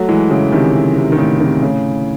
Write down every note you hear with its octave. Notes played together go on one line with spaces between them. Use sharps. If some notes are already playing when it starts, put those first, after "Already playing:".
Already playing: F#3 A3
E3 G#3
C#3 E3
C3 D#3
C3
D#3
A2 C#3
C3 D#3
A2 C#3